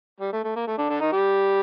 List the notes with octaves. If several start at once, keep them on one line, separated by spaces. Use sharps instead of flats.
G3
A3
A3
A#3
A3
D3 D4
D3 D4
D#3 D#4
G3 G4